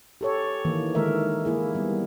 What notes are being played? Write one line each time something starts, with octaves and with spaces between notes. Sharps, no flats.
G4 A4 C#5
D#3 E3 A#3
D3 D#3 G#3 A3 A#4 E5
A#3 E4 G#4
G3 B3